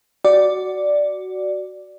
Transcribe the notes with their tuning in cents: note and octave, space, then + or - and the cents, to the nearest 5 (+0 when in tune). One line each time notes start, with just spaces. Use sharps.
F#4 +10 D5 +0